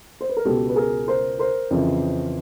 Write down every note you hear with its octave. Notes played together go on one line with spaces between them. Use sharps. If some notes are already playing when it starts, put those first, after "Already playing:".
C5
B4
A#4
C#2 B2 G4 A4
B4
G#4 A#4
A#4 C5
A#4 C5
F2 C#3 E3